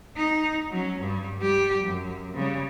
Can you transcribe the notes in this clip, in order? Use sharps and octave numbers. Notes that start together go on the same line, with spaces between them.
D#4
F#3 C#4
G2 G3
G3 G4
F#2
C#3 G3